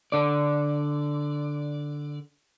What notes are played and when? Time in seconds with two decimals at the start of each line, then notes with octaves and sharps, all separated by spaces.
0.12 D3 D5